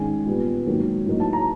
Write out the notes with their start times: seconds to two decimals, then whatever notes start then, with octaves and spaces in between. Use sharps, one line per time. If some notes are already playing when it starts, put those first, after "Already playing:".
Already playing: G#2 D#3 G#3 C#4 G#5
0.26 A#2 G3 B3
0.66 G#2 D#3 F#3 A#3
1.06 A2 F#3 A#3 D#4
1.20 A5
1.33 A#5